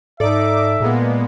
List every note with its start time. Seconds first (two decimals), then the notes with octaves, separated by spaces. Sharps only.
0.20 G#2 D#4 A4 D5 E5 D6
0.80 A#2 G#3 A#3 B3